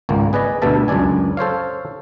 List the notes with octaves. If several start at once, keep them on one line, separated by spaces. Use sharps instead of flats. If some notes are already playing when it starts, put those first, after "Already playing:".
G#1 C#2 A#3
G#4 B4 D5 D#5
D2 G2 B2 A4 E5 A5
C#2 F#2 D4 D5 G#5
A4 C5 C#5 F5